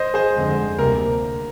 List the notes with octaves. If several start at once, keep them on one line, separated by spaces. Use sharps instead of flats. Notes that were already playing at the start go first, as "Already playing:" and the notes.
Already playing: C5 D#5
G#4 C5
F2 D3 G#3 C4
D2 C3 G3 A#3 A#4